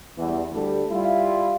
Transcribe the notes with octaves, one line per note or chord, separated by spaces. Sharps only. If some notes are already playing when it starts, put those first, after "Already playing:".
E2 E3 G3
D2 G3 A4
G3 E4 F4